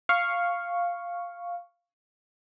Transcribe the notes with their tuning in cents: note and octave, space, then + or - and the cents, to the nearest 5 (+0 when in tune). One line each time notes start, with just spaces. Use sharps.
F5 +0 C#6 +0